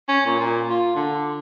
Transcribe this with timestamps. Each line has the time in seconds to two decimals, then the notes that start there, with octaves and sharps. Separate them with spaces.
0.09 C#4
0.26 A#2
0.40 A#2
0.70 F4
0.96 D3